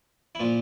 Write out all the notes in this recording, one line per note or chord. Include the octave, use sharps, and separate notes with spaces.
E4
A#2 F3 F4